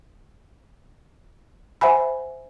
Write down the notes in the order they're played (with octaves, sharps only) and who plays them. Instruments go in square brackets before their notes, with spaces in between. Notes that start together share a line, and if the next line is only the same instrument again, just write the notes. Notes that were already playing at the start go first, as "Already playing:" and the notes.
[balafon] C5 E5 F#5 G#5 B5